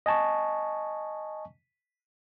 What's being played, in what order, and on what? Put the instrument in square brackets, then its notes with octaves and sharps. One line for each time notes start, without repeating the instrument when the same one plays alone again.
[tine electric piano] D#5 G#5 A5 C#6